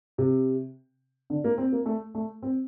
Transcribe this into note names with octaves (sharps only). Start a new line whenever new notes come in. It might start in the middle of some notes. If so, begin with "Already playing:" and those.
C3
D3
A#3
C4
A#3
A3
A3
C4